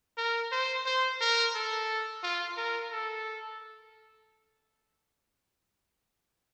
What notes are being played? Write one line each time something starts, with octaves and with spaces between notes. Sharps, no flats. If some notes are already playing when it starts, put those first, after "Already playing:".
A#4
C5
C5
A#4
A4
F4
A#4
A4